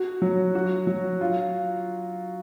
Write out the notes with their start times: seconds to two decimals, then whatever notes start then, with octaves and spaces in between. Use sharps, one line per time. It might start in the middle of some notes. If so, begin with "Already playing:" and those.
Already playing: F#4
0.22 F#3
0.55 F#4
0.87 F#3
1.21 F4